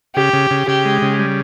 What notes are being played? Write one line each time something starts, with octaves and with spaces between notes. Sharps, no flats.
C#3 G4
C#3
C#3
C#3 G4
G#3
C#3
G3